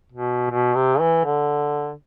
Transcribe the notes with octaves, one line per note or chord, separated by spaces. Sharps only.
B2
B2
C3
E3
D3